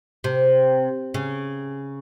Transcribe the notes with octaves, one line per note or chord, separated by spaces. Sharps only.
C3
C#3